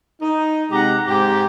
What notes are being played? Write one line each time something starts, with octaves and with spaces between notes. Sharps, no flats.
D#4
C3 G#3 G4 F#5 A#5
G#2 C4 G4